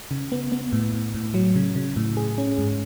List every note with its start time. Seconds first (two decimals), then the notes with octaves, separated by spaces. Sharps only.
0.11 C#3
0.32 B3
0.52 B3
0.73 A2
0.94 A2
1.15 A2
1.34 F#3
1.56 C#3
1.76 C#3
1.96 A2
2.17 G#4
2.38 C#4
2.58 G#2